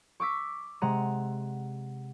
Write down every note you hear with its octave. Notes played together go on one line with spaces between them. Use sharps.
C#6 D6 E6 B6
C3 G#3 F#5 A#5 D#7